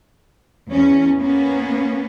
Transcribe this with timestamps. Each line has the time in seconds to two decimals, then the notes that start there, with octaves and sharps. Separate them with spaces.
0.70 E2 C#4
1.18 A#3 B3 C#4